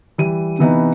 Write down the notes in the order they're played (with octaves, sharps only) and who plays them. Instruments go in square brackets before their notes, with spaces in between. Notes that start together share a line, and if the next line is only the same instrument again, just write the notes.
[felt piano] E3 G3 D#7
C3 E3 B3 D#4